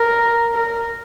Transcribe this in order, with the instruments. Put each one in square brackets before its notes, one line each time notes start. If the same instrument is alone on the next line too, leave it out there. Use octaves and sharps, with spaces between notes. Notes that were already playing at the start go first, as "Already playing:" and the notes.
Already playing: [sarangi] A#4
A#4